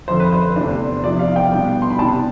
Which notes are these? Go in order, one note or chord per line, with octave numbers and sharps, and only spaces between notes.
F2 D3 F3 C5
B4
C5
E2 C3 E3 A3 D4
C3 F3 B3 E4 D5
F5
G5
B2 G3 B3 D4
C6
B5
C3 E3 B3 D4 A5